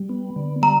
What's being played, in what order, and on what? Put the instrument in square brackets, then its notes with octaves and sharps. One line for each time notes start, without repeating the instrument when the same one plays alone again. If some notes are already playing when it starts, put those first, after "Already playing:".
Already playing: [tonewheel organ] G3
B3
D3
[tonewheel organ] G3 [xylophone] A#5